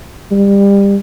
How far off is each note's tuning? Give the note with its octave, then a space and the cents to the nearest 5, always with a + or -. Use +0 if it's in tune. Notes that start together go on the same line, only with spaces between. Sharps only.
G3 +25